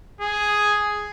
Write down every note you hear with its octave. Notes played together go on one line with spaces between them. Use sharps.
G#4